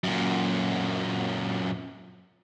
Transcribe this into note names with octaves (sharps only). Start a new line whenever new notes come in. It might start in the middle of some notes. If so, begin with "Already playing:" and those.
F#2 A#2